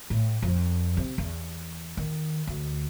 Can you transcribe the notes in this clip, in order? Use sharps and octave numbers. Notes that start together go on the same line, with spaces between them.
A2
F2
C3
E2
D#3
D2